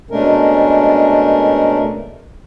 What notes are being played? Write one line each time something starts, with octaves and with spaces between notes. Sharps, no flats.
B2 G#3 A3 C#4 D4 A#4